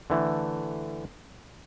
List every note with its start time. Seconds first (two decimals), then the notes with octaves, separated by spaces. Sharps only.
0.10 D3 E3 A3